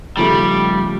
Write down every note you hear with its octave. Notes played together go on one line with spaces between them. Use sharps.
D#2 C#3 F3 G3 A3